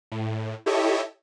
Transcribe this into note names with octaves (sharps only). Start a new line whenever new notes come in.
A2
E4 G4 A4 C#5 D#5 E5